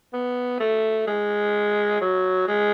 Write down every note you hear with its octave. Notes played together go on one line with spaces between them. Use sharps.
B3
A3
G#3
F#3
G#3